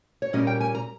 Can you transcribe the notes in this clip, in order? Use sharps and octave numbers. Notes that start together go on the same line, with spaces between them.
C#5
A#2 G3 A#3 C#4 D#5
G5
G#5
A#5